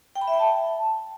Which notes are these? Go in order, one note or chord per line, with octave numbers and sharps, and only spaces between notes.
G5
B5
E5
G5
A5